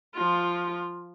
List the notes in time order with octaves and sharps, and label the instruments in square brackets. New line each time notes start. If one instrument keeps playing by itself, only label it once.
[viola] F3 F4